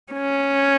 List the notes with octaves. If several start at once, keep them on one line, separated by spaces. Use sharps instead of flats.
C#4